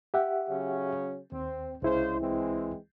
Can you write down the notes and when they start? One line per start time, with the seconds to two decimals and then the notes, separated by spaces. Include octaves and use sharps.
0.14 G4 E5 F#5
0.50 C#3 F#3 C#4
1.32 D#2 C4
1.82 C2 C#3 G#3 E4 C5
2.20 E3 G#3 C4